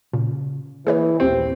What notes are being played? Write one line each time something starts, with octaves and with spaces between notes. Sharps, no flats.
A#2 C#3
E3 A#3 G#4 B4 C#5
A#1 D#2 A#3 C4 G4